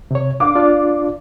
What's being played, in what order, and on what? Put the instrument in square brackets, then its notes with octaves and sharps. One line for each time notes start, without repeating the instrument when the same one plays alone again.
[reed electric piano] C3 C#5
[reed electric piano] D4 [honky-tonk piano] F5 D6
[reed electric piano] D4 F4 D5